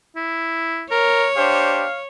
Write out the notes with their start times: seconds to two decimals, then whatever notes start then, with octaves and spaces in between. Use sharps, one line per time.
0.16 E4
0.91 A#4 C#5
1.36 D4 G4 C5 F5